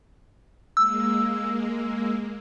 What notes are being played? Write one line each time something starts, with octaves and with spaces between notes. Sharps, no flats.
G#3 A#3 E6